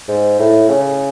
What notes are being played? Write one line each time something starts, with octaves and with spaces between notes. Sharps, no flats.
G#2
A2
C#3